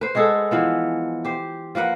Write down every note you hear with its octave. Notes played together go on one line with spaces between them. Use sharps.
B4 C5
G#3 F#4 G#4 A4
E3 F3 B3
G4 C5
F3 A#3 B4 F#5